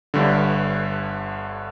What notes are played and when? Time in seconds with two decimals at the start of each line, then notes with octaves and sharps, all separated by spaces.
0.14 G1 G2 D3